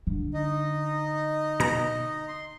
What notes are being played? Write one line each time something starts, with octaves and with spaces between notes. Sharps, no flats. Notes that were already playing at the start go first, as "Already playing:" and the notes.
D3
D#4 D#5
B2 A#5
C6